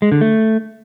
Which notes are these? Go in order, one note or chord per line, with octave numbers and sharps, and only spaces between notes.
G#3
D3
A3